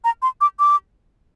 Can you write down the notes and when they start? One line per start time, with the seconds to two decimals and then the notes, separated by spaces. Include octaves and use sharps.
0.04 A#5
0.22 C6
0.41 D6
0.59 D6